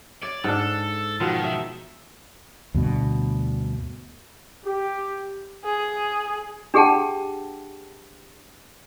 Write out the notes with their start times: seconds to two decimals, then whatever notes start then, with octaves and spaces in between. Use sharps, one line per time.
0.23 C#5 D5
0.44 G#2 D4 A4
1.20 B2 D#3 F3 F4
1.44 E5
2.74 D2 G2 B2
4.66 G4
5.65 G#4
6.74 D4 G4 G#4 F#5 G5 A5